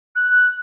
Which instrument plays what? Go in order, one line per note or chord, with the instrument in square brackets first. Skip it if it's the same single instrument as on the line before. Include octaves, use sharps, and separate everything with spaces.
[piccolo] F#6